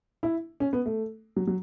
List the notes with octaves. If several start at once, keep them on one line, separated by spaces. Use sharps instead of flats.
E4
C#4
B3
A3
F#3
F#3